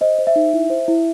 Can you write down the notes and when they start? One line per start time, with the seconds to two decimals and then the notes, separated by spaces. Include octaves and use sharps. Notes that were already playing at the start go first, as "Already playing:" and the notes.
0.01 C5 D#5
0.18 C5
0.27 E5
0.36 D#4
0.53 E4
0.70 C5
0.88 E4